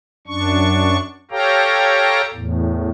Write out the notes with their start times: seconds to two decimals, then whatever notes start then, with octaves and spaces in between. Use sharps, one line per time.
0.27 F#2 D4 C#6
1.31 G4 A4 C#5 F5 G5 A#5
2.34 E2 A2